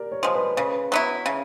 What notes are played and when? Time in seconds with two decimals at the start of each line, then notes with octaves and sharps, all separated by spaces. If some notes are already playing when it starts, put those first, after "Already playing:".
Already playing: G4 A#4 D5
0.12 C#5
0.23 F3 G#3 C5
0.35 B4
0.57 C#3 B4
0.92 F#3 B3 E4
1.26 C#3